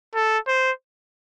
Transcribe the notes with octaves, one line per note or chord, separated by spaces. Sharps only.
A4
C5